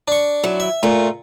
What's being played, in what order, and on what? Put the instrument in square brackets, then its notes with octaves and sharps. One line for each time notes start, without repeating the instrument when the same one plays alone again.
[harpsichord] D4 C#6
[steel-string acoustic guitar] F#3 E4
[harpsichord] E5
[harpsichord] A#2 [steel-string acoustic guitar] A3 F4